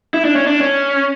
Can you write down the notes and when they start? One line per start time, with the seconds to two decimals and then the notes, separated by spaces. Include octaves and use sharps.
0.14 E4
0.25 D4
0.36 C#4
0.47 D4
0.61 C#4